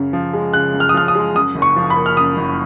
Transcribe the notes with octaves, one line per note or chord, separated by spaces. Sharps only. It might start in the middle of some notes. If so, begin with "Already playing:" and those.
Already playing: F#2 C#3
F3
G#3
C#3 F#6
F#2
F6
D#6
F3 F6
D#6
G#3
F#2 D#6
F#1
C#6
F3
B5
A#3
F6
F#2 D#6
F#1